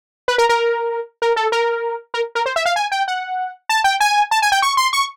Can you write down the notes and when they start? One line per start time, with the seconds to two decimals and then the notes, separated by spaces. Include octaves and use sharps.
0.28 B4
0.38 A#4
0.49 A#4
1.22 A#4
1.36 A4
1.52 A#4
2.14 A#4
2.35 A#4
2.46 C5
2.56 E5
2.65 F5
2.76 G#5
2.92 G5
3.08 F#5
3.69 A5
3.84 G5
4.00 G#5
4.31 A5
4.42 G#5
4.52 G5
4.62 C#6
4.77 C6
4.93 C#6